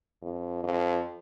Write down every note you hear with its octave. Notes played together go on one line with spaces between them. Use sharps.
F2
F2